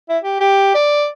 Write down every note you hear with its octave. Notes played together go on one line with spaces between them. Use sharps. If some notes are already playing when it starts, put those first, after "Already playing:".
E4
G4
G4
D5